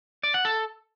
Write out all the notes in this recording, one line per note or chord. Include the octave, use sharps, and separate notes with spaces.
D5
F#5
A4